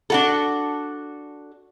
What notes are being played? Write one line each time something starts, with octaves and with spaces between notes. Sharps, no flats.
D4 F#4 A4